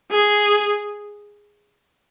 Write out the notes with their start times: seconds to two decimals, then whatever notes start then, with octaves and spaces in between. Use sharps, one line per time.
0.10 G#4